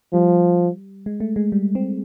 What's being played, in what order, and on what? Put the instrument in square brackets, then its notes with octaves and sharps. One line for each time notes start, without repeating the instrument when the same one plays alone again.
[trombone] F3 [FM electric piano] G3
[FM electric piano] G#3
A3
G#3
G3
C4